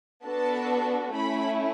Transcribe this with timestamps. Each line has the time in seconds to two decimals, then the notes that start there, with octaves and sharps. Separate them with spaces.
0.25 B3 D4 F#4 A4 A5
1.14 A3 C#4 E4 B5